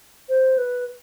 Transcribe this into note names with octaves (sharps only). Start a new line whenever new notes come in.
C5
B4